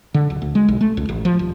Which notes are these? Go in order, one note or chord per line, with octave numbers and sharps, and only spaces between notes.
D3
D1
D2
G#3
B1
A3
C#2
A1
F3
D#1